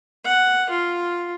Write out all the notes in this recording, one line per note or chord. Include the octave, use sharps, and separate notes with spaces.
F#5
F4